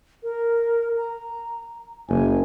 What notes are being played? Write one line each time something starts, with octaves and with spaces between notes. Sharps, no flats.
A#4
A#5
F#1 G#5